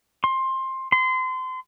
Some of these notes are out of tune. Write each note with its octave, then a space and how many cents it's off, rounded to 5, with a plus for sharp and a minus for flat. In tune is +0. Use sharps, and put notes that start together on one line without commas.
C6 +15
C6 -30